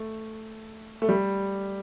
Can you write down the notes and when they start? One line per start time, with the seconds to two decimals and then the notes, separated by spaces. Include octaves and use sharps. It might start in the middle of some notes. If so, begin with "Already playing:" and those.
Already playing: A3
1.02 A3
1.09 G3